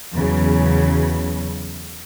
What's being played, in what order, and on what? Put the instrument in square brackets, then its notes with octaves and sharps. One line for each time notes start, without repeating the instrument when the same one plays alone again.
[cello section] E2 C#3 F#3